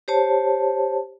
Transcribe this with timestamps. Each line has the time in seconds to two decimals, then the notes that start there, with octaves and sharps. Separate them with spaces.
0.08 G4 C5 C#5 A5